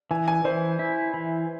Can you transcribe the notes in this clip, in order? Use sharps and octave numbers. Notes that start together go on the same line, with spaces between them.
E3 G#5
G#5
E3 C5
E4
E3